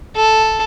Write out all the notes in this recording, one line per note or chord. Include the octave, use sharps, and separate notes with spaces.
A4